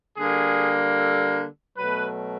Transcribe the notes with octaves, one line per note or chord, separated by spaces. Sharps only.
D3 G3 A#3 G#4
A4
B2 F#3 A3 B4